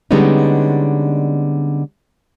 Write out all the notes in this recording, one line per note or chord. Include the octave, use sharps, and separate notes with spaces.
D3 G3 G#3 B3 C#4 D#4